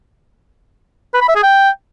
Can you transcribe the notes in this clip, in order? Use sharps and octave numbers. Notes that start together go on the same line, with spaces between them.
B4
B5
E5
G#4
G5